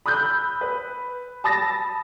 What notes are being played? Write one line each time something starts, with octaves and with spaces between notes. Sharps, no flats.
B5 D#6 E6 F#6 G6
B4
A5 B5 D#6 A6 A#6